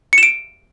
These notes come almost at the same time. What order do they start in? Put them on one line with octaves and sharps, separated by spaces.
C#7 E7 D7